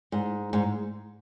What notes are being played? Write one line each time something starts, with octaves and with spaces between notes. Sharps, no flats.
G#2
G#2